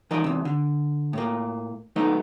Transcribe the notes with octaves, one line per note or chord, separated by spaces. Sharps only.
E3 F#3 D#4 A#4 D5 D#5
E2 C3
D3
A2 A#3
F#3 A3 B3 D#4